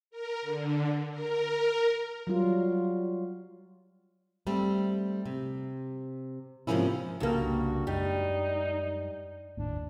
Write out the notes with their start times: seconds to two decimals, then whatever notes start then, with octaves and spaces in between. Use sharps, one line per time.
0.11 A#4
0.42 D3
1.11 A#4
2.27 F#3 G3 F4
4.47 G3 A3 C4
5.25 C3
6.67 G#2 C3 F3 A#3 C#4 E4
7.20 C2 G2 C#3 A#3 D4 F#4
7.87 F#2 G3 G#3 D#4
9.57 G1 D#2 A2 D4